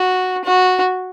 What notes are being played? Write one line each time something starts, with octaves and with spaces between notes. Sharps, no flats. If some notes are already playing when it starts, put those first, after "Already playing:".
Already playing: F#4
F#4